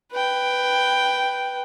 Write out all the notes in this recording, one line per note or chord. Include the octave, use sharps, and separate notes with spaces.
B4 G5